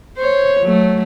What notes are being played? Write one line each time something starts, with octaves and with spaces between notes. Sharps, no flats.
C5 C#5
F#3 A3